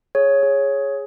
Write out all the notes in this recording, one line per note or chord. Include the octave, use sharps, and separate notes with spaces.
G#4 C#5
G#4